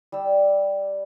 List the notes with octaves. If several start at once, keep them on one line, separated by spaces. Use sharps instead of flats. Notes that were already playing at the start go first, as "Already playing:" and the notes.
G3 G4 E6